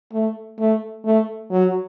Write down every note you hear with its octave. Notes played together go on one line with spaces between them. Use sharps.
A3
A3
A3
F#3